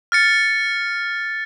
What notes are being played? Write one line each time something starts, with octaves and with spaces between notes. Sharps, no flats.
F6 A6 C#7